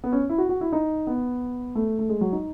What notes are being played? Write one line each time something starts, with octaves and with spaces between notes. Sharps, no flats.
B3
C#4
E4
F#4
F#4
E4
D#4
B3
A3
A3
G#3
F#3
D#4